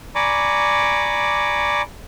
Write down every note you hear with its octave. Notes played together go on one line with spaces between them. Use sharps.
D5 G#5 A#5 B5 C#6 D6